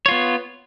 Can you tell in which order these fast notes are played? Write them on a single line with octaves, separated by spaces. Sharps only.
C#5 F4 B3